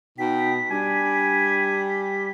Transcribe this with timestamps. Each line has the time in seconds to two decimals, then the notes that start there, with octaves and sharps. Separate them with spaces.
0.18 B2 D#4 G5 B6
0.70 G3 D4 G#5